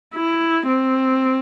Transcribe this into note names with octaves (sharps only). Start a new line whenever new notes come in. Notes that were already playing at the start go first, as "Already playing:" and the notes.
E4
C4